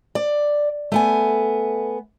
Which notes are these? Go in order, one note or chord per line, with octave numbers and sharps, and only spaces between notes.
D5
A3 B3 G#5